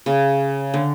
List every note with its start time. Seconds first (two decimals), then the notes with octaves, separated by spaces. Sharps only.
0.06 C#3
0.74 D3